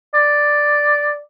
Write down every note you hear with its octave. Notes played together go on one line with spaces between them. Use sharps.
D5